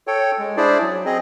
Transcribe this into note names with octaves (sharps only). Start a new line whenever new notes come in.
A4 C#5 G5
G#3
D4 E4 G#4 C5 D5
F#3
C4 G#4 D#5